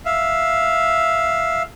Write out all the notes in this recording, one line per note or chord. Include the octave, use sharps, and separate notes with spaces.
E5 F5